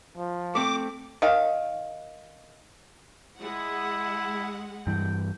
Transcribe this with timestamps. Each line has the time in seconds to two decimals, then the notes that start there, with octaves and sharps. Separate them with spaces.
0.18 F3
0.55 A3 C4 D6
1.22 D#3 F5
3.39 G#3 E4 F#5
4.87 G2 E3 G5